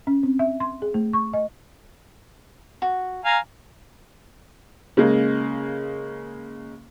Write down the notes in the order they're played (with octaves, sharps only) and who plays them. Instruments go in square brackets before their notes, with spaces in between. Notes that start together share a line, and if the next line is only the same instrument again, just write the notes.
[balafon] C#4
C4
E5
C6
G#4
A3
C#6
D#5
[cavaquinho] F#4
[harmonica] F5 G#5 A#5
[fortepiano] C#3 G#3 A#3